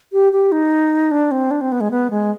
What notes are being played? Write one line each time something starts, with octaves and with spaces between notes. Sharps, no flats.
G4
G4
D#4
D4
C4
D4
C4
B3
G#3
B3
G#3